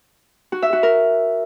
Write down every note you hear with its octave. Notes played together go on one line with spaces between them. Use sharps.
F#4
E5
F#4
A#4